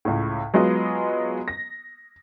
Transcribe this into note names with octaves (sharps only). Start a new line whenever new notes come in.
C#2 A2
F#3 G#3 B3 F4 D#5
A#6